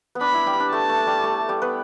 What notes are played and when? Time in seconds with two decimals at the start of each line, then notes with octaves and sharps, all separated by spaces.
0.15 B3
0.21 D4 B5
0.34 E4
0.47 G3 G4
0.60 D4
0.72 A3 A5
0.89 A3
1.07 G3
1.23 A3
1.49 G3 G4
1.62 B3 B4